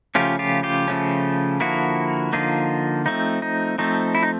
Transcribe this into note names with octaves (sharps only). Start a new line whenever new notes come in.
C#3 F3 A3 C#4 F4 G4
F4 G4
F4 G4
C#3 F3 A3 C#4
D3 F3 A#3 E4 F#4
D3 F3 A#3 D#4 F4
F3 A3 C4 D#4
D#4
F3 A3 C4 D#4
E4
D#4